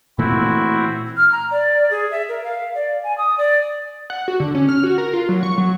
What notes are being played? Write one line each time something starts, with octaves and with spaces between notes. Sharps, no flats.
A#2 E3 A3 C4 E4 F#4
F6
A#5
D5
G#4
E5
A#4
F5
D5
G#5
D#6
D5
F#5
F#4
D3
C#4
F6
F#4
A#4
F4
F#3
C#6
F#3